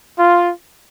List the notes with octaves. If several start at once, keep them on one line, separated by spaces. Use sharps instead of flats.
F4